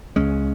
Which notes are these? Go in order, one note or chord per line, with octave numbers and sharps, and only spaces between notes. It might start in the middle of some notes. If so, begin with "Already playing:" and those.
C#2 C#3 G#3 C#4